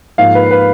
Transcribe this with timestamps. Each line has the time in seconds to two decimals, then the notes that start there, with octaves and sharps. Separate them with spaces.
0.18 G#2 F3 A#3 F5
0.35 B4
0.51 B4